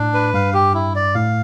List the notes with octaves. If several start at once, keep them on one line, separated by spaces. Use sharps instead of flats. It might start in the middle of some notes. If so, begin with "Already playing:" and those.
Already playing: A2 D4
B4
G2 F5
G4
E4
D5
A2 F5